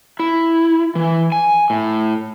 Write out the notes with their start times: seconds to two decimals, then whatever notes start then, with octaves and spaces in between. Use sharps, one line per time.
0.19 E4
0.95 E3
1.32 G#5
1.70 A2